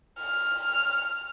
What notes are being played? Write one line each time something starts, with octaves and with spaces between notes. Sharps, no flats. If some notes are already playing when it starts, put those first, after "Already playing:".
F6